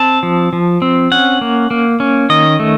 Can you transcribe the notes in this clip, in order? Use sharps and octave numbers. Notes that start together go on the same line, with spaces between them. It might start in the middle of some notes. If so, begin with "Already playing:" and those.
Already playing: C4 A5
F3
F3
C4
C#4 F#5
A#3
A#3
C#4
D#3 D#5
A3